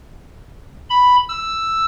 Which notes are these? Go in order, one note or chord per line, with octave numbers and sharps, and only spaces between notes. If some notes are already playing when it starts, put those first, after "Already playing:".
B5
E6